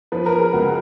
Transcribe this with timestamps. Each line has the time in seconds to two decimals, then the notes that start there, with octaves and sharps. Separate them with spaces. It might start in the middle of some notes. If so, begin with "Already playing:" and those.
0.12 F3 B4
0.26 A#4
0.32 F3
0.39 G#4
0.53 C#2 F#4